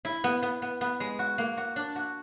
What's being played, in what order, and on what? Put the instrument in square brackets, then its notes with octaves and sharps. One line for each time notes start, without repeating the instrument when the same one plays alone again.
[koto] E4
B3
B3
B3
B3
G#3
F#4
A#3
F#4
D4
F#4